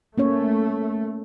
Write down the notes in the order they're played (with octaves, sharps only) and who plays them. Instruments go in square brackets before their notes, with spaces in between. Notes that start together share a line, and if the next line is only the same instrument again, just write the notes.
[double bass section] A3 [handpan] A#3 C#4 C#5